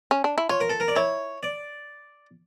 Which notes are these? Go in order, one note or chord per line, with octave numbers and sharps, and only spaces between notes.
C#4
D4
E4
F4 C#5
A#4
A4
A#4
D5
E4 C#5
D5